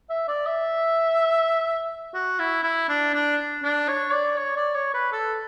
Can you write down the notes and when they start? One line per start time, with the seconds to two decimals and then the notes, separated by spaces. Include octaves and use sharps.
0.10 E5
0.28 D5
0.46 E5
2.14 F#4
2.39 E4
2.64 E4
2.89 D4
3.14 D4
3.63 D4
3.88 C#5
4.13 D5
4.38 C#5
4.56 D5
4.75 C#5
4.94 B4
5.13 A4